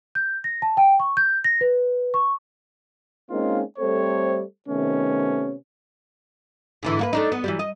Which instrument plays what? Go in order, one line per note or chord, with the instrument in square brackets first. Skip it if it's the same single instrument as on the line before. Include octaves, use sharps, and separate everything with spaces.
[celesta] G6
A#6
A5
G5
C#6
G6
A#6
B4
C#6
[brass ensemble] G#3 A#3 C4 C#4 D#4 F4
G3 A3 C4 A4 C5 C#5
C3 D#3 A3 B3 C#4
[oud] G#2 D3 E3
A#3 F#4 B4
A3 D4 D#4
B3
E3 F#3 G3
D#5